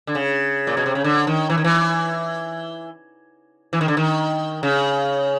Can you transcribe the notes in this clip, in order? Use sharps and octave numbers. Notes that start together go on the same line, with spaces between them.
D3
C#3
A#2
B2
C3
C#3
D3
D#3
E3
D#3
E3
E3
D#3
D3
D#3
C#3